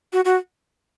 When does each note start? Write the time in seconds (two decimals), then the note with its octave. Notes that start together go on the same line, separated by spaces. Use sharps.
0.13 F#4
0.25 F#4